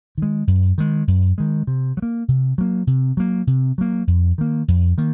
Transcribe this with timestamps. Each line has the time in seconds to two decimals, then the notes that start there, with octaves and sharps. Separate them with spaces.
0.18 D#3 G#3
0.47 F#2
0.78 D#3 G#3
1.08 F#2
1.38 D#3 G#3
1.67 C3
1.97 F#3
2.02 A#3
2.28 C3
2.58 F#3 A#3
2.87 C3
3.17 F#3 A#3
3.47 C3
3.78 F#3 A#3
4.07 F2
4.38 D#3 A#3
4.68 F2
4.98 D#3 A#3